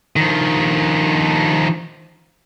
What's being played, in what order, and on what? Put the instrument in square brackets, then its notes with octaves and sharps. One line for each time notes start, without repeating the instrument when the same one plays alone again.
[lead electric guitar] D#3 F3